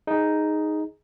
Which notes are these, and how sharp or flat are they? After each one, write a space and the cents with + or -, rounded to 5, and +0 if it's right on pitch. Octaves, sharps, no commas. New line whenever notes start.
D#4 +0 G#4 +0